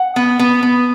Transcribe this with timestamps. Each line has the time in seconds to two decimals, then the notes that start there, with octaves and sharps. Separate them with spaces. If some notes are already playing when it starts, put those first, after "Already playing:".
Already playing: F#5
0.16 B3
0.39 B3
0.63 B3